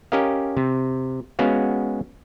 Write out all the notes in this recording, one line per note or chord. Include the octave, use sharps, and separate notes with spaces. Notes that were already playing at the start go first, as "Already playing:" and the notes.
C#4 G4 A#4 D#5 F5
C3
G#3 B3 C#4 F#4 F5